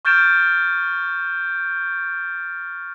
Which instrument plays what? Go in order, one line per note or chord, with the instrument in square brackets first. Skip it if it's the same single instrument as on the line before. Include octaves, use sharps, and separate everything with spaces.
[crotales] C#6 F6 G6 A6 D7 E7